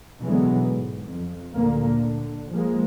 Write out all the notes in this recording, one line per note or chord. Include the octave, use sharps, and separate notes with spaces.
B2 D3 E3 F#3 G#3 B3
G#2
F2
D2 A#2 D3 A#3
D3
F3 G#3 A#3